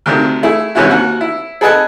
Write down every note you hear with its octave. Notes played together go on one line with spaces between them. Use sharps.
D2 C3 D#3
A3 E4 G#4
G#2 C3 E3 C#4 E4 F#4
D#2 F#4
E4
G#4 A4 B4 D#5 F#5 G#5